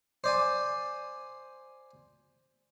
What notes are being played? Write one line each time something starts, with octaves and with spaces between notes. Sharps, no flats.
C5 D5 G#5